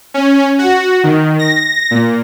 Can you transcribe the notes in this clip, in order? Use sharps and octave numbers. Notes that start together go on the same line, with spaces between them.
C#4
F#4
D#3
A#6
A#2